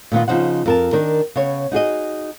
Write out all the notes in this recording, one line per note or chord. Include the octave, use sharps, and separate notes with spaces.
A#2 D#3 B3 F4
C#3 F3 D#4 C5 F#5
F2 A#4 A5
D#3 D4 A#4
C#3 B3 C#5
D#4 F#4 G#4 D#5